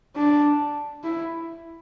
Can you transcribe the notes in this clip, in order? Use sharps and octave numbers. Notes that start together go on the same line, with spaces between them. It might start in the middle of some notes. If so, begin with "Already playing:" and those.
D4
E4